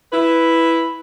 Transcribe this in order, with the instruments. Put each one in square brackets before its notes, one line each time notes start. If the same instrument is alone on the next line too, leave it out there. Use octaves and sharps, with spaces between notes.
[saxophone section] E4 B4